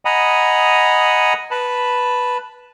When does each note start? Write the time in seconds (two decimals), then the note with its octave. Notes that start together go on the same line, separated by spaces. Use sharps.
0.05 D#5 F#5 G#5 A#5 B5 D#6
1.51 B4 A5 B5